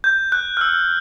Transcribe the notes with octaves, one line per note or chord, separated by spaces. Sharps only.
G6
F#6
F6
E6